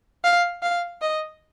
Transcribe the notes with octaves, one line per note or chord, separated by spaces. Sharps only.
F5
F5
D#5